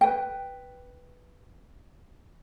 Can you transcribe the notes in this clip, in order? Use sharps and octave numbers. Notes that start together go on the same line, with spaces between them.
B4 G5